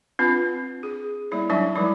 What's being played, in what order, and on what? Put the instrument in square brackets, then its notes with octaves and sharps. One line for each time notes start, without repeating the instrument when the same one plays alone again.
[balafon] C4 D4 F4 B4
G#4
G3 A#3 E4 C#5
F#3 G3 D4 D#4 E5 A5
F3 G3 G#3 D#4 E4